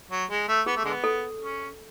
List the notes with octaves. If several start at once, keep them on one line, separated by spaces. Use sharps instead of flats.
F#3
G#3
A3
B3 G#4
A3
D3 G#3 B3
A4
C#4